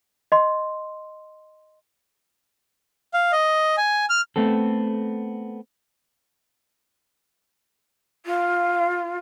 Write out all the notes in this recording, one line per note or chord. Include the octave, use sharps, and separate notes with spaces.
D#5 C6
F5
D#5
G#5
F6
A3 B3 C4 A4
F4